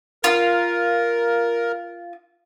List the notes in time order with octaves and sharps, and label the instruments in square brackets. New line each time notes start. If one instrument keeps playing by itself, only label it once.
[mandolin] F4 [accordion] A#4